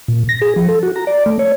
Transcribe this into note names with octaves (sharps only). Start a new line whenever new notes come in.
A#2
A#6
G#4
F3
A4
F#4
A#5
D5
A3
C#5